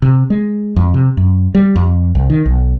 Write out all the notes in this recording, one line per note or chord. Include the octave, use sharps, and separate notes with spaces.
C3
G#3
F2
C3
F#2
G3
F2
C2
D#3
B1